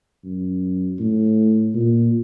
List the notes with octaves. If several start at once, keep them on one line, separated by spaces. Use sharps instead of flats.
F#2
A2
A#2